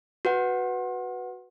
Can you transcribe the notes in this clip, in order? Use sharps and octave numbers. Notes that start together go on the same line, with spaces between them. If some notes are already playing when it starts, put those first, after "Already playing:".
F#4 B4 F#5